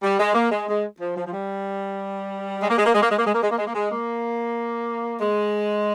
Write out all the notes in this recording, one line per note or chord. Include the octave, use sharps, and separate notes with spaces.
G3
G#3
A#3
G#3
G#3
F3
F3
F3
G3
G#3
A#3
G#3
A#3
G#3
A#3
G#3
A#3
G#3
A#3
G#3
A#3
G#3
A#3
G#3
A#3
G#3